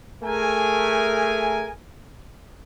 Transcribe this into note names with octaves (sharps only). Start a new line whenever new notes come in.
A3 G#4 A#4 G#5